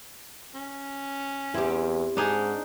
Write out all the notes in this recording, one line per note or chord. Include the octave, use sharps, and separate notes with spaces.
C#4
E2 C4 E4 G4
G#2 D4 D#4 G#4